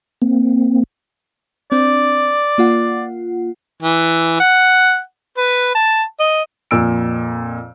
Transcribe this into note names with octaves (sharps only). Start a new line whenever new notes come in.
A#3 C4
C4 D4 D5
A#3 F4 F#5
E3
F#5
B4
A5
D#5
F2 A#2 E6 D7